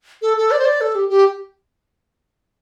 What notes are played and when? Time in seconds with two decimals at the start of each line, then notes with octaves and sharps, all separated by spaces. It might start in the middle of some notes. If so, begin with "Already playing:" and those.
0.22 A4
0.37 A4
0.51 D5
0.59 C5
0.65 D5
0.81 A4
0.95 G4
1.09 G4